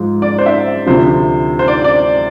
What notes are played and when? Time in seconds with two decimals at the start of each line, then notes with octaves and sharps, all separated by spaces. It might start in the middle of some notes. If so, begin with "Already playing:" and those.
Already playing: G#2 F3
0.22 D5
0.38 C5
0.46 E5
0.86 D2 C3 F3 C5
1.59 C5
1.68 D5
1.84 D5